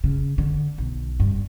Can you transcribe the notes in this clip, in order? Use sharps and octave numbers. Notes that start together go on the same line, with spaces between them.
C#3
D3
B1
G2